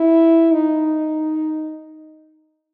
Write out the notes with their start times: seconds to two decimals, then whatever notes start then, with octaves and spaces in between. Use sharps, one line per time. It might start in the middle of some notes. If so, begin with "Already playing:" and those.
Already playing: E4
0.52 D#4